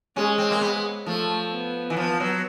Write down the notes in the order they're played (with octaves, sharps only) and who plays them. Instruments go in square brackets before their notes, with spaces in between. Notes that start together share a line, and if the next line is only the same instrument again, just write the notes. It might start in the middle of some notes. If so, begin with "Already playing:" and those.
[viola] G#3 [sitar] C#4
[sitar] C4
A#3
B3
[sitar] F3 [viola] A3
[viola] B3
[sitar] E3
F3
F#3